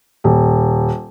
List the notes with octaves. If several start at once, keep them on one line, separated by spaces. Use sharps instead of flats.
D#1